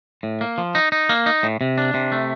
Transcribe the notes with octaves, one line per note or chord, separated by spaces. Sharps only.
A2
A#3
F3
D#4
D#4
A#3
D#4
A2
C3
D4
C3
A3